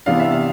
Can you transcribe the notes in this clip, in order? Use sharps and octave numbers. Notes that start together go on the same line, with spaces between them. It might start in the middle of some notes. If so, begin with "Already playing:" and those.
C3 E3 B3 D4 F5
E5
F5